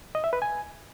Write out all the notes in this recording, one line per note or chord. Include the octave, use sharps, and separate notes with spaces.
D#5
E5
B4
G#5